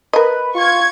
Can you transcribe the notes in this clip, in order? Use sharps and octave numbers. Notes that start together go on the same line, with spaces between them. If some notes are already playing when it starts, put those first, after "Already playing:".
A#4 B4 D#5
F4 C#6 G#6